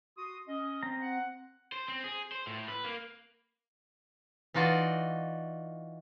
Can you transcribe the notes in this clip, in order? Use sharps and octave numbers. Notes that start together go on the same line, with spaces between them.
F#4 C6 D#6
C#4 D#5
C4 A#5
F#5
C5
C4
G#4
C5
A2
B4
A#3
E3 D#4 F4 F#4 D5 D#5